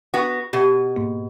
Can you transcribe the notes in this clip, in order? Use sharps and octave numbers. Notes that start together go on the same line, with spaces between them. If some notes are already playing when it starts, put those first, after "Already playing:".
B3 F#4
B2 G4
G#2 A#3